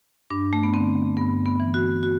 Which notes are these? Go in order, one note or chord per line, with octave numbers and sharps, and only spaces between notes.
G2 D4
A3
B3
D3 C4
G2 B3
B3
E3
F#4
F#4